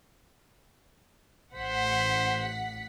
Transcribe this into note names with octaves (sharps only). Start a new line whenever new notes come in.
A1 C5 F#5 B6